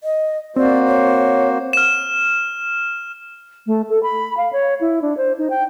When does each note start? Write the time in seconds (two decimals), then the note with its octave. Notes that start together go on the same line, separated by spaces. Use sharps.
0.04 D#5
0.56 A#3 C4 F#4 C5 D5
0.87 C#5
1.73 F6 E7
3.67 A3
3.90 A4
4.03 B5
4.37 F5
4.53 C#5
4.81 E4
5.02 D4
5.17 C5
5.38 D#4
5.50 G5